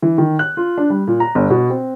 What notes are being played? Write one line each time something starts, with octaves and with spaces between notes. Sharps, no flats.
E3
D#3
F#6
F4
D4
G3
A#2
A#5
G1
B2
C4